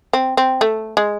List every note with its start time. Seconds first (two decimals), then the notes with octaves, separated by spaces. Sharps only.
0.13 C4
0.37 C4
0.61 A3
0.97 G#3